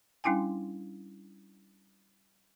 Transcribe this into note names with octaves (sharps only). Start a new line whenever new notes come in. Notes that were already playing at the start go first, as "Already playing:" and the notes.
G3 C#4 D4 E4 G5 G#5